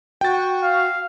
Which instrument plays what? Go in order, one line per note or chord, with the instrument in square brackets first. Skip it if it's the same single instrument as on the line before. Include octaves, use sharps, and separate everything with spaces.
[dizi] F#4 [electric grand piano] G5 A6
[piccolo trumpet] F5